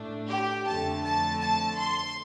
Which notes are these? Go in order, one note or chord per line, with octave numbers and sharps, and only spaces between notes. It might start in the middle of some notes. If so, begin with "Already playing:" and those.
Already playing: A2 A3 D4
G4
F2 D3 A3 A5
A5
A5
C6